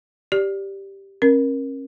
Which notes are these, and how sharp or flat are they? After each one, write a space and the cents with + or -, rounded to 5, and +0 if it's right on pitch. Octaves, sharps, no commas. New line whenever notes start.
G4 +0 D5 -5
C#4 -40 A#4 +15